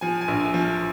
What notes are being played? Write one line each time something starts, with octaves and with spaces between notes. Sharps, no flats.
F3 G#5
G#5
A#1
F3